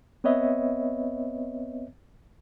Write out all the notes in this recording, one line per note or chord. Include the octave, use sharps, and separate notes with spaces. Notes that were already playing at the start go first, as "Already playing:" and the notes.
B3 C4 B4 C#5 D#5 E5